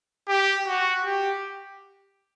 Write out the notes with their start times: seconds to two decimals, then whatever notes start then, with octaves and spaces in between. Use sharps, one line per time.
0.28 G4
0.67 F#4
1.05 G4